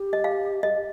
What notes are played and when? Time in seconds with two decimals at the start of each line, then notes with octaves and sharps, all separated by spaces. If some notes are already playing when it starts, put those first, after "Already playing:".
Already playing: G4
0.13 D#5
0.24 F5
0.63 D#5